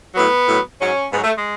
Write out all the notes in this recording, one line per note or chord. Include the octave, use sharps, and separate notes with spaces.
A2 F#3 B3
A2 F#3
G#2 F#3 C#4
G#2 F#3 B3
A3
G#3